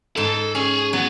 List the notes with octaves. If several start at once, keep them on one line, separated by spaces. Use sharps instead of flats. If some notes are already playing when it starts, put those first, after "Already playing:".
G#2 A4
C#4 G#4
F#3 B3